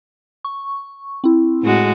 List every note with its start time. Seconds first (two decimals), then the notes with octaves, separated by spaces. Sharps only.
0.45 C#6
1.24 C4 E4
1.62 A2 G#3 F#4